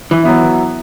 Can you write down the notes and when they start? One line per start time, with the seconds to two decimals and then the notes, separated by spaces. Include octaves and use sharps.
0.11 E3
0.23 F#3 B3 E4